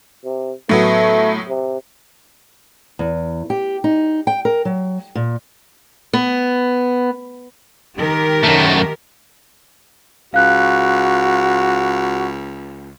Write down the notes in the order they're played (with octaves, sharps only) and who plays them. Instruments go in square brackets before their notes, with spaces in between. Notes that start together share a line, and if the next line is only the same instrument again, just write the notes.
[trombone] C3
[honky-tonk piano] A2 F#3 B3 [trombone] A3
[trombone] C3
[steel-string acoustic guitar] E2
G4
D#4
G5
A#4
F#3
A#2
B3
[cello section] D#3 G4 A#4
[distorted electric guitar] F#2 A3
[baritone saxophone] C#2 [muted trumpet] F#4 [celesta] F5 F#6